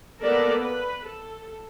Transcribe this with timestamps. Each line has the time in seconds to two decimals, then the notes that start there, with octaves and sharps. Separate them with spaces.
0.22 A#3 B3 A4 A#4 D5
0.61 B4
1.04 A4